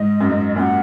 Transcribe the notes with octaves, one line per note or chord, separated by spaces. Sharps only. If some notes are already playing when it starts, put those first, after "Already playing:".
Already playing: G#2 D#5
F#2
G#2
F#2 A#2 F#5 G#5